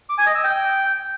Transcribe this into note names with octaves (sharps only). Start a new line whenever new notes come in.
D6
G#5
D#5
E6
G5